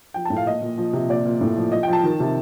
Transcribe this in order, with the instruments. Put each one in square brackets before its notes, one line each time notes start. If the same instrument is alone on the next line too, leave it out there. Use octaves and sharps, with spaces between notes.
[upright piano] F3 G5
A5
A2
F5
A#2 D#5
A#2
F3
C3
A#2 D5
A#2
A2
F3
F3 D#5
G5
F3
A5
D#3
C3